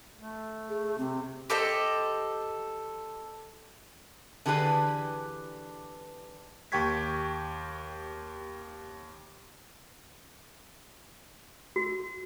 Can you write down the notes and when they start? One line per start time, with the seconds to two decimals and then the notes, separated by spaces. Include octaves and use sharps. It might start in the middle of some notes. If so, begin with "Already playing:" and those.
0.18 A3
0.69 G#4
0.98 C3 C4
1.50 G4 A4 C5 D#5
4.46 D3 E3 G4 G#4 B4 D5
6.72 D#2 G4 G5 C#6 G#6 B6
11.76 F#4